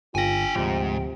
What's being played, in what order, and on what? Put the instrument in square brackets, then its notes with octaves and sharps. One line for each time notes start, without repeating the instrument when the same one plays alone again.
[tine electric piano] G1 A#6 [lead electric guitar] D4 G#5 [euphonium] F4 [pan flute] G5
[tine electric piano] D2 F3 [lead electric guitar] G#2 [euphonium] C3